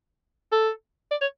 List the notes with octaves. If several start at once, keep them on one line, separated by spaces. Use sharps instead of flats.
A4
D5
C#5